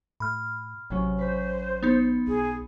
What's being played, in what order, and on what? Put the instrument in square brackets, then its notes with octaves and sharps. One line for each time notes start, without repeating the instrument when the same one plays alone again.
[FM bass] A2 [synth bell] B5 F6
[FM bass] A1 [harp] C3 F#3 C#4
[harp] B4 B6 [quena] C5
[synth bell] B3 D#4 [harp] B5 C6
[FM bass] B1 [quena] G#4